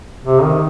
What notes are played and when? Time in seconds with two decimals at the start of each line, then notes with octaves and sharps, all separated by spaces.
0.24 C3
0.43 D#3